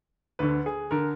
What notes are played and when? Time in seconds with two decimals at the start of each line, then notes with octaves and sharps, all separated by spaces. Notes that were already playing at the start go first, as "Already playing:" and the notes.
0.39 D2 D3 B4
0.66 G#4
0.91 D3 A#4